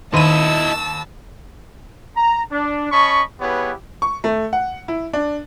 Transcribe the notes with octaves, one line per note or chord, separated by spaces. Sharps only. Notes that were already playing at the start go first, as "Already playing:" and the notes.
D#2 D#3 E4 D#5 A5 B5 E6 D#7
A#5
D4
C#4 D#5 A5 B5 C#6
B3 E4 G4 G#4 B4 C#5
C#6
A3
F#5
E4
D4